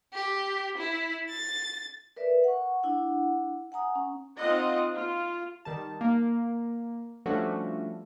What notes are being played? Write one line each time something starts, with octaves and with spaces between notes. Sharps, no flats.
G4
E4
A6
A#4 B4 D5 E5
F#5 C#6
D4 E4 F#5
F#5 G#5 A#5 D#6
C#4
C4 D#4 F4 D#5 F#5
F4
D#3 G3 A5
A#3
F3 G3 A3 C#4 D4 F#4